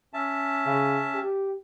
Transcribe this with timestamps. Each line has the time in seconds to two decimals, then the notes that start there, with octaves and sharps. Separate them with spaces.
0.14 C#4 E5 A5
0.66 C#3
1.14 G4